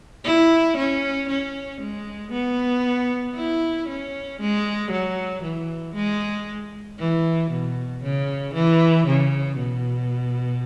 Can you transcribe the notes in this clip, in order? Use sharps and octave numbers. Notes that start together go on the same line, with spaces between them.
E4
C#4
C#4
G#3
B3
E4
C#4
G#3
F#3
E3
G#3
E3
B2
C#3
E3
C#3
B2